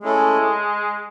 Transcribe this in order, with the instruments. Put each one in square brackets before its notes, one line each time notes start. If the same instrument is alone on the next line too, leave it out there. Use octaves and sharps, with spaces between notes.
[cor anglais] G#3 [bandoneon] A3 C#4 E4 A4